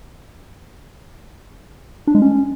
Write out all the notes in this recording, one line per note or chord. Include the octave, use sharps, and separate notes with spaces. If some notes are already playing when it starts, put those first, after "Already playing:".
D4
G#3
C#4